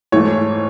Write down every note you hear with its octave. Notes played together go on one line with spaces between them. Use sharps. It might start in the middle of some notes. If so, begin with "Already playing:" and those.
G#2 E3 A3 C#5